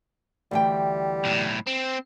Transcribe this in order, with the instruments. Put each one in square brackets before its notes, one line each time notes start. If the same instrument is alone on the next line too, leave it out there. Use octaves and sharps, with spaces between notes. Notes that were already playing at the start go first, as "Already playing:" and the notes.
[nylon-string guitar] D2 E3 G5 [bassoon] G3
[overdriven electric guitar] B1 A2
C4